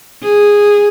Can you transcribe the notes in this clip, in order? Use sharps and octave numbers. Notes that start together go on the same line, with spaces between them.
G#4